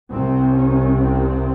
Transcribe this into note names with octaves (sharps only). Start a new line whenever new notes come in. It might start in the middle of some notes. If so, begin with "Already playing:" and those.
C2 C3 C4
C#4
C4